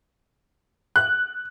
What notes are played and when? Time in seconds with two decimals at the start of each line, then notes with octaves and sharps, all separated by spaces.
0.96 F#6